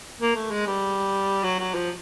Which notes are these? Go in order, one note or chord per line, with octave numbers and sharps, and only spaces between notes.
A#3
A3
G#3
G3
F#3
F#3
F3